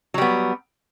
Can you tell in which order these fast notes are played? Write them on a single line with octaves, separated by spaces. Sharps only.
F#3 G3 B3